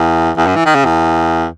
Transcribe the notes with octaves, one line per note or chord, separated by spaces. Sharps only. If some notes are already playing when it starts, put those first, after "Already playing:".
Already playing: E2
E2
F#2
E3
D#3
C#3
E2